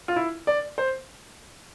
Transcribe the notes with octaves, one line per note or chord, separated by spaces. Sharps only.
F4
E4
D5
C5